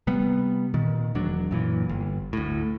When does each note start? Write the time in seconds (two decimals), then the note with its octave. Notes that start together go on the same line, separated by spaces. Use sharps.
0.07 C3 G3 B3
0.74 A#2 D#3
1.15 E1 F#3 D4
1.51 F#2 A#2 E3
1.89 G1
2.33 D2 A2